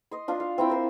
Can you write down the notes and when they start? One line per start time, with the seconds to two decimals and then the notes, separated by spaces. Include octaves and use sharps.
0.11 D#5 C6
0.28 D4 F4
0.40 F5
0.58 C4 E4 G5
0.70 A#4 C5